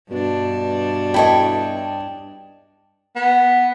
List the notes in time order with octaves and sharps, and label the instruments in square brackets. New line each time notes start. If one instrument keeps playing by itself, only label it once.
[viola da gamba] G2 D4 [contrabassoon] B2
[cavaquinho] E4 A4 C#5 [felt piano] D#5 G5
[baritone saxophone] B3